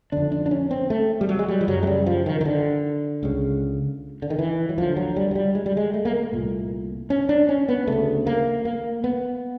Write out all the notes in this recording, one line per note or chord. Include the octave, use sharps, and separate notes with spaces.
F2 D3 D4
D4
D4
C#4
C4
A3
G3
F#3
G#3
G3
F3
F#2 C#3 F#3
G#3
G3
F3
D#3
D#3
D3
C#2 C#3
D3
D#3
E3
F#3
D2 D3 F3
F#3
G3
F#3
G3
G#3
G3
G#3
A3
A#3
A3
C2 A#2
C#4
D4
C#4
B3
D2 C#3 A3
A#3
A#3
B3